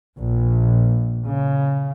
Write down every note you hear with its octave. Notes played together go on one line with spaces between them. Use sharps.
A#1
C#3